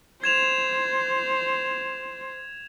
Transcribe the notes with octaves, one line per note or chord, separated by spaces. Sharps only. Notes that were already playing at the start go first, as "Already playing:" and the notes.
C5 G#6 E7 F7